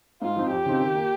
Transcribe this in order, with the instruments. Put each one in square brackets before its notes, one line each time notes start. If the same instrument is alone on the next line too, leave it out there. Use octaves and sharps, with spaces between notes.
[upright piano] G#2 [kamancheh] F4
[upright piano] F3 C4 D#4
[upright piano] F2 [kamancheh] G4
[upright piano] C#3 F3 C4 D#4
D#3
A#3 F4